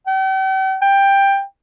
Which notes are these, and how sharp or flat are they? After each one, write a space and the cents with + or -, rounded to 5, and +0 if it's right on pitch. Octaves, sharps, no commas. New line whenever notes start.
G5 -45
G5 +10